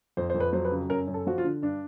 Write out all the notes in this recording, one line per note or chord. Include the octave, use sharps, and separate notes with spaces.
F2 C5
F2 C5
B4
F#3 C5
B4
C#3
F#2 A#4
F#2
A4
F3 F#4
F4
D3
G2 D4